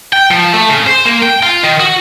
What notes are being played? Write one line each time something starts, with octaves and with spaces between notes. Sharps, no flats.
G5
F3
A3
C#3
C5
A#3
G5
F4
D#3
F#4